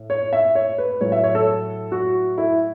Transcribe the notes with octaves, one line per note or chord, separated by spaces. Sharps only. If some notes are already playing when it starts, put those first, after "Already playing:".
Already playing: A2
C#5
E5
C#5
B4
A2 F#3 C#5
E5
C#5
A4
F#4
E4